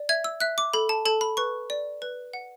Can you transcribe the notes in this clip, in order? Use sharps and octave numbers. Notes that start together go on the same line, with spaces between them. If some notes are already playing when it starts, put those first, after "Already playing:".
Already playing: D5
E5 G#6
E6
E5 F#6
D6
A4 B5
A5
A4 A5
B5
B4 C#6
D5
B4
F#5